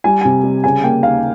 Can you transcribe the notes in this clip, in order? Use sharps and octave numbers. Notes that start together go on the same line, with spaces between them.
G3 G#5
C3 G#5
G3
C#3 G#5
A#3 G5
D#2 F5